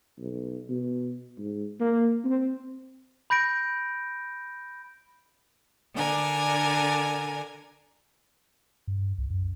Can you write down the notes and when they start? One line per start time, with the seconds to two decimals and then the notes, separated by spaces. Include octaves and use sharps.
0.19 B1
0.69 B2
1.38 G#2
1.80 A#3
2.24 C4
3.30 B5 G6 A#6 D7
5.95 D3 D4 A#4 G#5
8.87 G2
9.18 C2
9.30 F#2